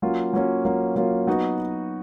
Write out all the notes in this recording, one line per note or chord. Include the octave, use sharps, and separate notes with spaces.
F#3 A#3 C#4 F4
F#3 A#3 C#4 F4
F#3 A#3 C#4 F4
F#3 A#3 C#4 F4
F#3 B3 D#4 F#4